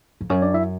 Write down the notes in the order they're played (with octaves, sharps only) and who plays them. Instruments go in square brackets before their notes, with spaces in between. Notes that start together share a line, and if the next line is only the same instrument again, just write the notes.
[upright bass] F2
[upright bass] F#2 [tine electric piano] C#4 C#5
[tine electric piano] D4 D5
E4 E5